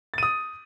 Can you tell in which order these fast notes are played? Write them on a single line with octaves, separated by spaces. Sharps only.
A6 D#7 D#6